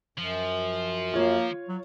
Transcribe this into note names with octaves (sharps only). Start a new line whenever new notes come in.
F#2 F3
A#3 F4 C#5
F#3